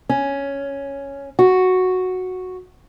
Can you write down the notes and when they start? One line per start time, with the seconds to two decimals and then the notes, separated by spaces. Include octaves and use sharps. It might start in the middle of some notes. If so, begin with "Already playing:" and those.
0.09 C#4
1.39 F#4